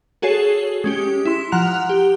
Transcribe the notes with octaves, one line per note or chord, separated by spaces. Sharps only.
F#4 G#4 A4 C#5 C7
G#3 C#4 G4
E4 C6
F3 F#5 A#5 F#6 F7
G4